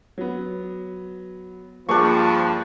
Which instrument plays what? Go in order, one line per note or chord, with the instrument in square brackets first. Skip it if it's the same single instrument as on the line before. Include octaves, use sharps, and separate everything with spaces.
[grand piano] F#3 B3
[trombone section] G2 F3 [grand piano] A#3 G#4 [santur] D4 C#6